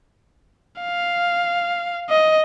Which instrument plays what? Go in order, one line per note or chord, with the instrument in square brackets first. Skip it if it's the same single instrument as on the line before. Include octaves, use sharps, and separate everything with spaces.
[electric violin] F5
D#5